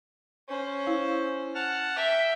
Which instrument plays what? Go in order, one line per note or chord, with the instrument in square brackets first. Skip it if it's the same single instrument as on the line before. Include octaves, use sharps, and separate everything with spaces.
[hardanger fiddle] C#4 C5
[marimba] E4 F5
[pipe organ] F#5 A5 F6
[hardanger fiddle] E5 [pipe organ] G5